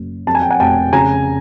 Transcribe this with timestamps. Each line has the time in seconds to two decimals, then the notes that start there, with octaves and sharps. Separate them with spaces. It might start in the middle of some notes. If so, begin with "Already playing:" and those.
Already playing: F#1 F#2
0.27 F2 A5
0.35 G#5
0.42 G5
0.50 F#5 G#5
0.60 F1 G5 A5
0.93 C#3 G#5 A#5